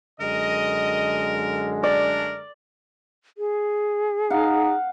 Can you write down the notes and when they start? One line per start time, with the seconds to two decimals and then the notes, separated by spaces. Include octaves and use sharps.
0.21 F#2 D3 G#3 A#4 D#5
1.83 A3 C#4 D4 A#4 D5
3.38 G#4
4.30 D#4 F5 F#5